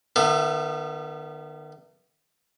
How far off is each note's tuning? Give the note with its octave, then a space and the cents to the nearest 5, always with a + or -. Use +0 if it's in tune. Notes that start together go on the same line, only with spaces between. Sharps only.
D#3 -40 B3 -15 E4 +20